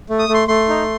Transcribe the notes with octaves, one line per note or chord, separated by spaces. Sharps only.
A3
D#6
A3
C6
A3 C6
D#4